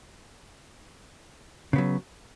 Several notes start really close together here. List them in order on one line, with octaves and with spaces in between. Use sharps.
C#3 B3 F#3